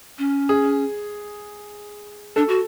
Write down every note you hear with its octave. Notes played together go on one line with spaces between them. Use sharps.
C#4
G#4
D4 A4
F#4